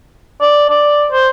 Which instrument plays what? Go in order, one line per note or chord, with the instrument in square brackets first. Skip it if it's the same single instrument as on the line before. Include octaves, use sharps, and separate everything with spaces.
[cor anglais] D5
D5
C5